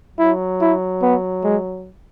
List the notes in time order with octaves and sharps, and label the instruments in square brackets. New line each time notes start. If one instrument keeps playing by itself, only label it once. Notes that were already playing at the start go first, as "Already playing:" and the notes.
[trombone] F#3 [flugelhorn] E4
[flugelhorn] E4
B3
G#3